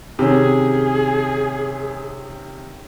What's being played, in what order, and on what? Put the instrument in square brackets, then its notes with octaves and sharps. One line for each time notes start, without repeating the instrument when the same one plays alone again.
[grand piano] C3 D#3 C#4 [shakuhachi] G#4